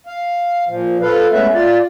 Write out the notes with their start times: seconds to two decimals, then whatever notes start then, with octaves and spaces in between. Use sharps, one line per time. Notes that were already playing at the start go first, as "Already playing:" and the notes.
0.07 F5
0.68 A#2 F3
1.01 F4 A4 B4 F5
1.32 G#3 A3 B3 C#4 B4 E5
1.54 F4 D5